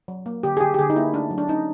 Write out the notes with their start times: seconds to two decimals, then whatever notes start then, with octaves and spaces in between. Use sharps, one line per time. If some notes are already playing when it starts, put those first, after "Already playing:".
0.08 F#3
0.26 A#3
0.43 D3 G4
0.57 G#4
0.61 D3 G4
0.74 G4
0.79 D3 G#4
0.90 D#4
0.96 A#3 E4
1.13 A3 D4
1.31 F#3
1.38 D4
1.48 C#4 D#4